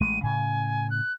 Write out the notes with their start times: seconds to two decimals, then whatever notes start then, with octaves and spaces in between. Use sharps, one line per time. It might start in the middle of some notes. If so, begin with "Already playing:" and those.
0.01 A1 G#3 A3 D#7
0.23 A2 C#3 G#5
0.90 F#6